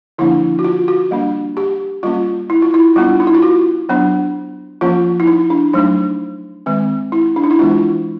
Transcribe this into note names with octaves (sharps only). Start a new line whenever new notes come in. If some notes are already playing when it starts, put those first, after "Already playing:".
D3 F3 A#3 D4 E4
F#4
F4
F#4
G3 A#3 D4
G4
G3 A#3 C#4 F4
E4
F4
E4
G3 B3 D4 F4
D#4
E4
F4
F#4
F#3 B3 D4
F3 A#3 C#4 F4
E4
D#4
D4
F#3 A3 D4 D#4
D#3 G#3 C4
E4
D4
D#4
E4
E3 G#3 B3 D4 F4